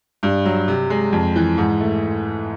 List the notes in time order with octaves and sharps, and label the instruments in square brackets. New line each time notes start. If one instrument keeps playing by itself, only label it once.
[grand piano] G2
F#3
C3
G#3
F2
E3
G#2
A3